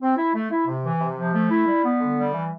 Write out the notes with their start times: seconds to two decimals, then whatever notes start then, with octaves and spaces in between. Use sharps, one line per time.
0.01 C4
0.17 E4
0.34 A3
0.51 E4
0.67 C3
0.84 E3
1.00 C3
1.17 F3
1.34 A3
1.50 E4
1.67 G3
1.85 B3
2.01 D3
2.17 G3
2.34 E3